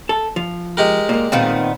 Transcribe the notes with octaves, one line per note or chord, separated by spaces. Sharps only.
A4
F3
G#3 G4 A#4
A#2 A#3
A#2 D#3 B3 C4